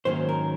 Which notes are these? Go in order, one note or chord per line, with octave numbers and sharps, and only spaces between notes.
G#2 D#3 F#3 A#3 C#4 C5
A#4